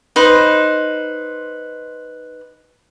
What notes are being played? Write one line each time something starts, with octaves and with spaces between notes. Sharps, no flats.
D#4 B4 C5